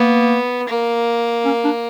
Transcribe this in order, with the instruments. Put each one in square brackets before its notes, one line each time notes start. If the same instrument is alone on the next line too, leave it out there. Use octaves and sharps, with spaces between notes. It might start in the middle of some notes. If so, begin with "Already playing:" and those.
Already playing: [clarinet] A#3 [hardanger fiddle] B3
[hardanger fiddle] A#3
[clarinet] C#4
D4